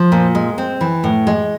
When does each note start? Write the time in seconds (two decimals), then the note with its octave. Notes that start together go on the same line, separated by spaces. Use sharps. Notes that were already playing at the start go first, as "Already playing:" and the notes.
Already playing: F3
0.12 A#2
0.35 G#3
0.58 C4
0.81 E3
1.04 A2
1.27 G#3